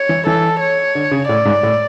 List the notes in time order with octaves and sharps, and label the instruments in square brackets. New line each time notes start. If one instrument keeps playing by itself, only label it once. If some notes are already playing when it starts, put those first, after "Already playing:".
Already playing: [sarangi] C#5
[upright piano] E3
[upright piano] E3 [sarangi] A4
[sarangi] C#5
[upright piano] D3
C#3
[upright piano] A2 [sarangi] D5
[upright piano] G#2
A2